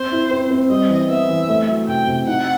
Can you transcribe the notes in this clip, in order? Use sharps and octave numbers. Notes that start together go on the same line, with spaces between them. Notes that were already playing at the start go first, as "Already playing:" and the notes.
Already playing: C4 C5
E4
C4
C4
G3 D#5
E3
B3 E5
E3
A3
F#3
C3 G5
C3
D#4 F#5